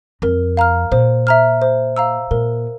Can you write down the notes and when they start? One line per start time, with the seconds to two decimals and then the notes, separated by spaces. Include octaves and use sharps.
0.22 F2 A#4
0.57 F5 A#5 F6
0.92 A#2 C5
1.27 E5 A#5 F6
1.62 C5
1.97 F5 A#5 E6
2.31 A#2 A#4